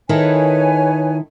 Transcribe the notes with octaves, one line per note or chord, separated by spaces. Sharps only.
D#3 E4 A4 B4 C#5 G#5